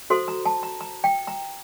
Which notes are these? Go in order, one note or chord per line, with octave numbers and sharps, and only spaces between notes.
F#4 A4 C5 C6
A#5
A5
A#5
A#5
G5
A#5